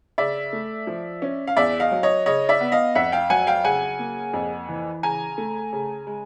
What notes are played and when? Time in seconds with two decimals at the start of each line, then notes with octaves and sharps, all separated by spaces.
0.18 C#3 D5 E5
0.53 A3
0.87 F3
1.22 C#4
1.47 F5
1.57 E2 D5 E5
1.80 D#5 F5
1.92 F#3
2.03 C#5 D#5
2.26 C#3 C#5 D#5
2.49 D5 E5
2.61 B3
2.72 D#5 F5
2.95 F2 E5 F#5
3.12 F5 G5
3.30 F#3 F#5 G#5
3.47 F5 G5
3.64 C#3 F#5 G#5
3.99 A#3
4.34 F2
4.68 E3
5.03 C#3 G#5 A#5
5.38 A3
5.73 C#3
6.07 G#3